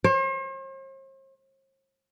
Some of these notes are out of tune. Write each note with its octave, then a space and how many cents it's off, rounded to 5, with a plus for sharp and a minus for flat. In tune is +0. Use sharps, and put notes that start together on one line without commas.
C5 +45